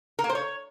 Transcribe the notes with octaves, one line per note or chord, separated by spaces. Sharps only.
A#4
A#3
C5
C#5